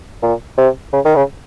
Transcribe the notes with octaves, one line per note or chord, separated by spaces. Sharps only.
A#2
C3
C#3
D#3
C#3